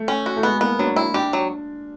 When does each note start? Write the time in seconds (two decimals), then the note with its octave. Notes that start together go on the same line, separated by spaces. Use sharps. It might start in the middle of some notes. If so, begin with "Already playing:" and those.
Already playing: A3
0.08 C#4
0.26 F#4
0.36 A3
0.43 G#3 B3
0.61 A#3 B3
0.79 F#3 D4
0.96 E4
1.14 D4 G4
1.33 F#3